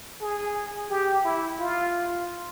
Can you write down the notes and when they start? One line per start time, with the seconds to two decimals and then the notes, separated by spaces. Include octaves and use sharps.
0.20 G#4
0.90 G4
1.24 E4
1.59 F4